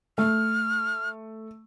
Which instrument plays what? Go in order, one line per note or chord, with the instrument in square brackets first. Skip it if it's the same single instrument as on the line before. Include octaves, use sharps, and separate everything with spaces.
[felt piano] A3 [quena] F6